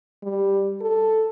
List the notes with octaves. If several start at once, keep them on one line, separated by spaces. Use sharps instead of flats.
G3
A4